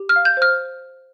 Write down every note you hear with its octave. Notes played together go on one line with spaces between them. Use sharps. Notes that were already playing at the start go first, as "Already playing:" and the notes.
Already playing: G4
F6
F5
G6
C5 F6